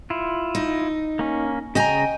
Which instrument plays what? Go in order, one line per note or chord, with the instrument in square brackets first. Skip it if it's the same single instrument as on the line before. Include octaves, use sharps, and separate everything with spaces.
[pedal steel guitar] E4 F4
[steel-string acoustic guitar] D#4
[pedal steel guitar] A#3 C#4
[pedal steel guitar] C#3 A#5 [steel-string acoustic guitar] D#5 G5 G#5